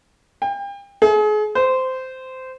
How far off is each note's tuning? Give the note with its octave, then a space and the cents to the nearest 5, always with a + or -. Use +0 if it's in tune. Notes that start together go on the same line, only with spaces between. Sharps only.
G5 +35
G#4 +35
C5 -15